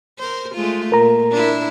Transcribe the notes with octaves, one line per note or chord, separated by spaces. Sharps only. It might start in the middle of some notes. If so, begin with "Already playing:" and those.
A#4 C5
G#3 A3 F4
A#2 A#4 A#5
D4 E4